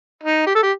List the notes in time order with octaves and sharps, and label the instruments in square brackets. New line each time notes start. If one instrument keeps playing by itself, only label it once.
[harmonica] D#4
G4
A4
G4